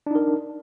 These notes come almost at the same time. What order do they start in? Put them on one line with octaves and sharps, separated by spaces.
D4 D#4 A#4